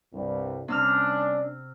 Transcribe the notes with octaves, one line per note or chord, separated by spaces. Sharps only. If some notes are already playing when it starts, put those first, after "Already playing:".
C2 G2
C3 G3 C#4 D4 E6 F6